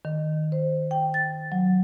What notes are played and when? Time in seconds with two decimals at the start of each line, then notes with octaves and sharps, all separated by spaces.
0.05 D#3
0.52 C5
0.91 G5
1.14 A6
1.52 F#3